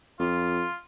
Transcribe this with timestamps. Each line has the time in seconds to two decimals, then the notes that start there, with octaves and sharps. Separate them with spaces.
0.19 F2 F4